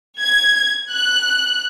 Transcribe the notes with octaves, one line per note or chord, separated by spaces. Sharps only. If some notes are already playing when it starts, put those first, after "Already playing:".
G#6
F#6